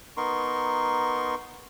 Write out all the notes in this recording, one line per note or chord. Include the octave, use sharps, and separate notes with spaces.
B3 D#4 A#4 C6 C#6